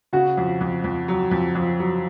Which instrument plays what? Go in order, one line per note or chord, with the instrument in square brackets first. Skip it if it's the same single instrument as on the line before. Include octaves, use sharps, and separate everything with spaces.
[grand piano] C#3 [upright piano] F#4
[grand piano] F2
F2
F2
F#3
F2
F2
F#3